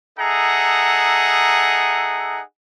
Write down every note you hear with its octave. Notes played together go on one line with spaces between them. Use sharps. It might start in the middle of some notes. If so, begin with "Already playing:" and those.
D#4 G#4 A4 E5 F#5 A#5